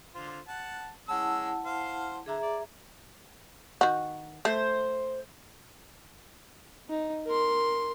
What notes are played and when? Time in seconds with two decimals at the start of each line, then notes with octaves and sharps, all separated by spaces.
0.15 D3 F4 C5
0.47 F#5 A5
1.08 G#3 C#4 E4 F#5 A5 E6
1.64 C5 F5
2.26 D3 G#4 E5 A#5
2.43 D5
3.81 D#3 F#4
4.45 A3 C5
6.90 D#4
7.26 A#4 C6